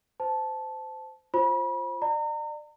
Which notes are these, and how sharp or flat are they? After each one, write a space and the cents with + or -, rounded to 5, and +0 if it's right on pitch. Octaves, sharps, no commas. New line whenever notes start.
C5 -25 A5 -10
F4 +0 C5 +20 B5 -35
D5 +30 A#5 -35